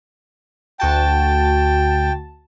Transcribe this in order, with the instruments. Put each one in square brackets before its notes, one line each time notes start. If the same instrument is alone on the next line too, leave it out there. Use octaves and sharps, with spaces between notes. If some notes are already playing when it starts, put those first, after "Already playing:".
[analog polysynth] D2 F#4 A5 [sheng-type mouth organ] G5